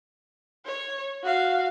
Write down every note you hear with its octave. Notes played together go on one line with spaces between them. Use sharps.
C#5
F#4 F5